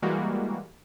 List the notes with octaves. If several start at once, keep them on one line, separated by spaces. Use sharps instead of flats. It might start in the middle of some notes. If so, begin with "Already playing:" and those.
E3 G3 G#3 A#3 F#4